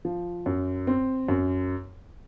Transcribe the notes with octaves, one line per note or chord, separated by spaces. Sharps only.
F3
F#2
C4
F#2